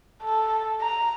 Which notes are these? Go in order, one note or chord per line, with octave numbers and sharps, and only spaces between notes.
A4
A#5